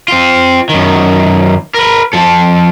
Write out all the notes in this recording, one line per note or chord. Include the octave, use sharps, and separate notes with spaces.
C4 F4
F#2 D#3
A#4 B4
F3 A4